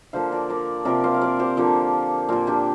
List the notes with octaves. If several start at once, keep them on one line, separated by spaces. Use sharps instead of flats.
D3 F3 A#3 C5 F5
A#4 D5
A#4 D5
C3 F3 A#3 A#4 D5
C5 F5
F5
A#4 D5
G4 C5
D3 F3 A#3
A#2 A#3 F4 A#4
D4 G4